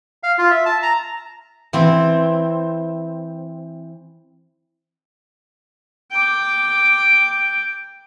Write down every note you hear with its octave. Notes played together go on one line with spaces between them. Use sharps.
F5
F4
E5
A5
A#5
E3 C4
G5 D6